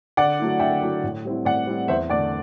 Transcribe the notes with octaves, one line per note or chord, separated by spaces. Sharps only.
D3 D5 F#5
F#3 A3 E4
D3 E5 G5
F#3 A3 E4
A2
G3 C4 E4
A2 D5 F#5
G3 C4 E4
E2 C5 E5
D3 A3 D5 F#5